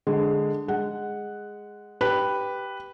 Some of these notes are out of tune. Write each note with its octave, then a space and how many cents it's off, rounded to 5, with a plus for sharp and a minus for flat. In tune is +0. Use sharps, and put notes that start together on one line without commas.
D3 +0 G#3 +0
G#3 -5 F#5 +0
G4 +0 B4 +0